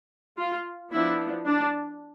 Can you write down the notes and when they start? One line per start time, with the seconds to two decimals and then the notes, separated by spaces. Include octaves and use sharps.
0.38 F4
0.92 F3 B3 D4 E4
1.47 D4